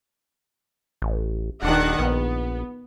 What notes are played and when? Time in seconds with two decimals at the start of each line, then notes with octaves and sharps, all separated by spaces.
1.02 A1
1.63 D#1 D#3 D4 F#5
1.99 A#1 B3